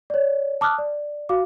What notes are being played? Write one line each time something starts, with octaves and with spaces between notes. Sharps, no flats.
C#5 D5
A5 D6 D#6 F6 F#6
D5
F#4 F5 D6